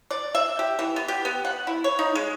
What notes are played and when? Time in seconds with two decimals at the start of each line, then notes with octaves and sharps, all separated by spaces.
0.11 D5
0.35 E5
0.59 G4
0.79 E3
0.96 B3
1.08 G4
1.25 B3
1.45 F#5
1.67 E4
1.84 C#5
1.99 D#4
2.15 G#3